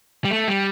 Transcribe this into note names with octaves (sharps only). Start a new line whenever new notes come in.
G3
A3
G3